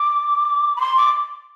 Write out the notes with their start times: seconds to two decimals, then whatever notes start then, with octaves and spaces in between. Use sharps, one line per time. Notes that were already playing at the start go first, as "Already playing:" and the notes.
Already playing: D6
0.76 B5
0.80 C6
0.97 D6